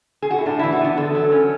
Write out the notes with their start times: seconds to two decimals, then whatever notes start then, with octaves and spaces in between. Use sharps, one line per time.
0.22 G#4
0.31 F#4
0.38 E4
0.46 A2 D4
0.59 E4
0.63 E3
0.72 F#4
0.80 B3 D4
0.97 D3 A4
1.15 F#3
1.32 C#4